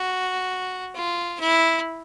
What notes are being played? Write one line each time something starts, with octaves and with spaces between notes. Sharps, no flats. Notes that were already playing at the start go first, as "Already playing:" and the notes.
Already playing: F#4
F4
E4